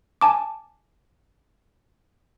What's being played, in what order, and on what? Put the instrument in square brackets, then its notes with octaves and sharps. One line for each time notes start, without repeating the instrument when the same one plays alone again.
[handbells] G#5 A5 D6